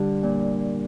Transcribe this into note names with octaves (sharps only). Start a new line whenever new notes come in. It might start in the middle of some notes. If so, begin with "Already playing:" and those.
Already playing: D3 G3
A#2